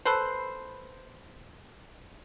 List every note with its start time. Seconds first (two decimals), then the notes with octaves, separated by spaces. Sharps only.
0.05 A4 B4 C5